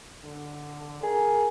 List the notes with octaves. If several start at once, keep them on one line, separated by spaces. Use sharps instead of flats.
D3
G#4 A#4